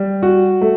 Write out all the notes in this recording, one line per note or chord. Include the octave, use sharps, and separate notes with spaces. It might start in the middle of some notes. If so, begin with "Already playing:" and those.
Already playing: G3
F#4
A3